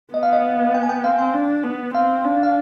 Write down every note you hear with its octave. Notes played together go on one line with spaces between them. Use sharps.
B3 D#5
F5
D#5
G5
G#5
G5
C4 F5
G5
D4
B3
C4 F5
D4
F5